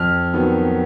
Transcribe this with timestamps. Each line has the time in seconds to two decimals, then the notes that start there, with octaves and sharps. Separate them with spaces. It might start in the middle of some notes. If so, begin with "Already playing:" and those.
Already playing: F2 F6
0.34 D#3 F#3 B3